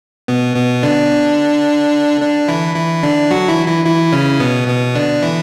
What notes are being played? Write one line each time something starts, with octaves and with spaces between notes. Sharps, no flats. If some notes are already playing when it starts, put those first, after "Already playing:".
B2 B3
B2 B3
D3 D4
D3 D4
E3 E4
E3 E4
D3 D4
F#3 F#4
E3 E4
E3 E4
E3 E4
C#3 C#4
B2 B3
B2 B3
D3 D4
E3 E4